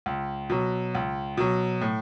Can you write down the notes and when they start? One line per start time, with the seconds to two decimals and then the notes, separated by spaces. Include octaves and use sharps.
0.06 C#2
0.50 B2 F#3
0.95 C#2
1.37 B2 F#3
1.81 A2